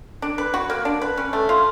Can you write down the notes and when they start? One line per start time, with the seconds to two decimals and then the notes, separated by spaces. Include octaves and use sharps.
0.22 D4
0.38 B4
0.54 F#4
0.70 A#3
0.85 D4
1.01 B4
1.17 C#4
1.33 A3
1.49 F4